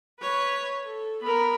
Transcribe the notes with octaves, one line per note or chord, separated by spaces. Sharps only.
B4 C#5
A4
B3 A#4 B5